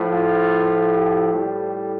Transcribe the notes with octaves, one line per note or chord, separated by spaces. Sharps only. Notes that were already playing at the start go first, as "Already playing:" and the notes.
Already playing: A2 F3
F4
G4
A2 G3